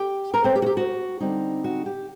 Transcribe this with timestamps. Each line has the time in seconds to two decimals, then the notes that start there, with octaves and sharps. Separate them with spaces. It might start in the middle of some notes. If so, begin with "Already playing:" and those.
Already playing: G4 G5
0.34 A#4 A#5
0.44 C4 C5
0.56 G4
0.62 F#4
0.66 G4
0.77 F#4
1.20 D3 G3 C4 D#4
1.64 F#4
1.86 G4